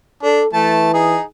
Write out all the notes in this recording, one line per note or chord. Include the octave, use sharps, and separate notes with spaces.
D4 A4
E3 A3 A5
D#4 G#4